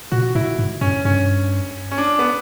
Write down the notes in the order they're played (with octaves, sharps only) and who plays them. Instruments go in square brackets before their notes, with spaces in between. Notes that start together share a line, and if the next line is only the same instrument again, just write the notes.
[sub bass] A#2 [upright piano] F#4
[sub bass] A2 [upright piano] E4
[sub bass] G#2
[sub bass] G2 [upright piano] C#4
[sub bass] G2 [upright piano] C#4
[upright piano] C#4
D4
B3